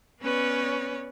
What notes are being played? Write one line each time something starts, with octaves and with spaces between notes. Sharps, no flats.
B3 C#4 B4 C#5 D5